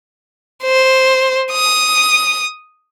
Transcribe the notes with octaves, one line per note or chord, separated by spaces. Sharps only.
C5
D#6